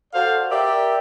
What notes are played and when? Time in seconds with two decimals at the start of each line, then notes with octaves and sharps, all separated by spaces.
0.14 F#4 A4 C5 D5 F5
0.50 G4 A#4 D5 E5